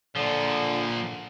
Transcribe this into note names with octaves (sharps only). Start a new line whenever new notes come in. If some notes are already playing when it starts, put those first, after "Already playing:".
A#2 D3 F3